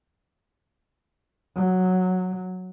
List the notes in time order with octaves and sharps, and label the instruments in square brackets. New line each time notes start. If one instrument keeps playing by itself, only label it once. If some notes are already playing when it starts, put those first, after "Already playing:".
[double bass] F#3